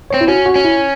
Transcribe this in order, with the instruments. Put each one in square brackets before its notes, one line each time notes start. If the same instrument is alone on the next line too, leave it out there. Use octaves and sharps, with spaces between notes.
[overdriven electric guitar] C4 [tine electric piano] C#5
[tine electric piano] E4
[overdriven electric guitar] C#4 [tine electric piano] F#4
[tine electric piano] F#4
[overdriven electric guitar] C#4
[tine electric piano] E4